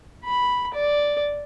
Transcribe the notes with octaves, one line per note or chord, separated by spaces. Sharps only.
B5
D5